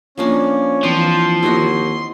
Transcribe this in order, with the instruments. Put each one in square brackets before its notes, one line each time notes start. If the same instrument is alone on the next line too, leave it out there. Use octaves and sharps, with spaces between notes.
[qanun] F3 A#3 D4 [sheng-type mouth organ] C#4
[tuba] E3 [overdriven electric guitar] F3 [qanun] C4 [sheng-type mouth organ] C6
[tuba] D#2 [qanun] E4 F#4 D#5